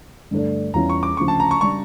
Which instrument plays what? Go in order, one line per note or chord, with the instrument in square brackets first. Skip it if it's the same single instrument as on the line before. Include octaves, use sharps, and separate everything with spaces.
[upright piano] G2 D3 A3 D4
[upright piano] E2 E3 G3 C#4 F4 [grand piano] A#5
[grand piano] C#6
D6
[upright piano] D2 C#3 F3 [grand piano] C#6
[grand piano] A5
A#5
C#6
[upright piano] C#3 G3 D4 [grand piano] C#6